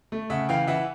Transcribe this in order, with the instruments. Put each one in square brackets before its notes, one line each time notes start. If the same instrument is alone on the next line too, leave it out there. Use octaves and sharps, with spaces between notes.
[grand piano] A3
C#3 E5 F#5
E3 F5 G5
E3 E5 F#5